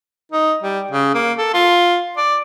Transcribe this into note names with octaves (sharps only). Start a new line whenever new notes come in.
D#4
G3
C#3
A#3
A4
F4
D5